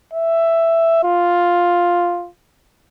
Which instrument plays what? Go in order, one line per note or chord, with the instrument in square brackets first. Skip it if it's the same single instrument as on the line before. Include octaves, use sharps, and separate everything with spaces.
[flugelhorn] E5
F4